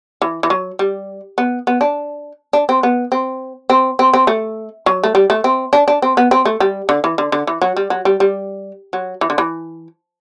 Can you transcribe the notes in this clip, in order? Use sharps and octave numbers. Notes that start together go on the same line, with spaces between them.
E3
E3
F#3
G3
B3
B3
D4
D4
C4
B3
C4
C4
C4
C4
A3
F#3
A3
G3
A3
C4
D4
D4
C4
B3
C4
A3
G3
D3
E3
D3
D3
E3
F#3
G3
F#3
G3
G3
F#3
E3
D3
E3